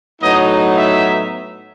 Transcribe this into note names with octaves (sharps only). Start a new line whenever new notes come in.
A2 F#3 B3 D#4 D#5
E5